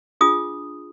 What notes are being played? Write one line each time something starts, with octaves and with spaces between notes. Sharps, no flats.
D4 F4 G#4 D#6